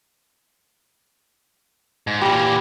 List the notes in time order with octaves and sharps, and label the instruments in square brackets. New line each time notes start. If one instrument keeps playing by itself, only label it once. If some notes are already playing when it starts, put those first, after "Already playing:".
[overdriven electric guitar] G#2
[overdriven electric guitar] A#2 E3 [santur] G3